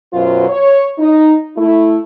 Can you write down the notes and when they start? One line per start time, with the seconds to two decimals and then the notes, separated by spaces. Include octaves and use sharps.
0.13 F#2 B2 F#3 F4 C5
0.49 C#5
0.98 D#4
1.57 A3 E4